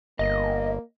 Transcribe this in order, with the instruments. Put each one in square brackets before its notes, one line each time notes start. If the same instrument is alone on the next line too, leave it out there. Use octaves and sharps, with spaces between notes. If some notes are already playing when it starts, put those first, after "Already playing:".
[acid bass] G1 [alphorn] A#3 [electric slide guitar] D#5